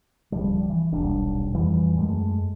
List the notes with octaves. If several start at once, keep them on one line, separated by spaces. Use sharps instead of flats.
D1 C#2 F3 G3
E3
D#1 B1 G3 D4
F2 E3 G3
F#2 G#3 A3